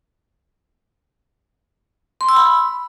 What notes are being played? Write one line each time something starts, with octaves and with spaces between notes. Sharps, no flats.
C6
E6
B5